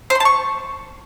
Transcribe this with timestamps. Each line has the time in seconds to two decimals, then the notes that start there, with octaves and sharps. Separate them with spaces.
0.10 C5
0.15 C6
0.20 A5
0.25 C#6